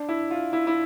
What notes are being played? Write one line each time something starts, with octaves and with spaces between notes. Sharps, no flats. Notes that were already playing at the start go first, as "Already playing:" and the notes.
Already playing: D4
E4
F4
E4
E4